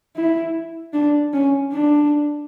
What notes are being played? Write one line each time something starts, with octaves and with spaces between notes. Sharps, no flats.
E4
D4
C#4
D4